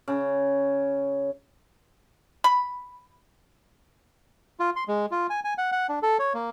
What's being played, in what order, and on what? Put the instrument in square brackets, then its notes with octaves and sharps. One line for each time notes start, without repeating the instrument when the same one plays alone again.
[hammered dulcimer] C#3
[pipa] B5
[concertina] F4
C6
G#3
F4
G#5
G#5
F#5
F#5
D4
A4
C#5
A#3